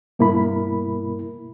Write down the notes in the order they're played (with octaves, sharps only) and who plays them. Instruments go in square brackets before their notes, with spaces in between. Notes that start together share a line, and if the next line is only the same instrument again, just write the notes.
[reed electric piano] G2 B2 A#3 E4 A#4 B5